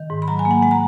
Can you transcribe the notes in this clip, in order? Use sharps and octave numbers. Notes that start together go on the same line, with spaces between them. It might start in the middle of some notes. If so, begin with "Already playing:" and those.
Already playing: D#3
G#2
B5
F#3 A#5
G#5
A#3
F#5
G#3 F#5
A#5